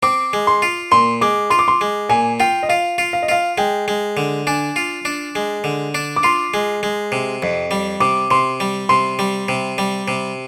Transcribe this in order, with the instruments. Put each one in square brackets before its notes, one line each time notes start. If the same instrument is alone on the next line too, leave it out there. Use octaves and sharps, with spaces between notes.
[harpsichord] C4 [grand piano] D6
[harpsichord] G#3
[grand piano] C6
[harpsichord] F4
[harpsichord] A#2 [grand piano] C6
[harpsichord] G#3 [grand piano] D6
[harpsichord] F4 [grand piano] C6
[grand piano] D6
C6
[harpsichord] G#3
[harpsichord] A#2 [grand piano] G#5
[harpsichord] F4 [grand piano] G5
[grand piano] D#5
[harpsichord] F4 [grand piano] F5
[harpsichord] F4
[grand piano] F5
D#5
[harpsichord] F4 [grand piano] F5
[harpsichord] G#3 [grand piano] G5
[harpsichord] G#3
D3
[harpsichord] D4 [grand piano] G#5
[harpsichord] F4
D4
G#3
D3
D4
[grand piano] D6
[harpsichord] F4 [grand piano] C6
[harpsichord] G#3
G#3
C3
F2
G3
[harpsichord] C3 [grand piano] D6
[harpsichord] C3 [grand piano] C6
[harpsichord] G3
[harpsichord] C3 [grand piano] C6
[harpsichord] G3
C3
G3
C3